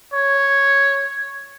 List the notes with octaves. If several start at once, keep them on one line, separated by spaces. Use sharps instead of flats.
C#5